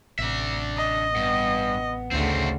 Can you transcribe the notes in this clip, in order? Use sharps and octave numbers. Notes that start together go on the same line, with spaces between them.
A1 C3 D4 E5
D#5
G2 B3
D2 C#3 A3 C4